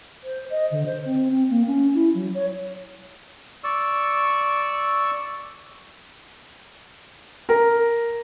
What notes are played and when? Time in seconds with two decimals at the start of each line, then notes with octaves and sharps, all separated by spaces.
0.24 C5
0.51 D#5
0.72 D3
0.86 C5
1.06 C4
1.31 C4
1.50 A#3
1.67 C#4
1.95 E4
2.15 F#3
2.35 C#5
3.64 D5 C#6 E6
7.49 A#4